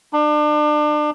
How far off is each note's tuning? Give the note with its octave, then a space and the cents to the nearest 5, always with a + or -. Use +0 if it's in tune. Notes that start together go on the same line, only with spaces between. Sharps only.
D4 +30